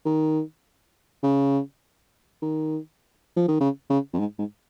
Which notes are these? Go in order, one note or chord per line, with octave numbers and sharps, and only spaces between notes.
D#3
C#3
D#3
F3
D#3
C#3
C#3
F2
G#2
G#2